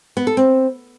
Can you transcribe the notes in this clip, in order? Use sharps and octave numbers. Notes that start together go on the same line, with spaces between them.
B3
A4
C4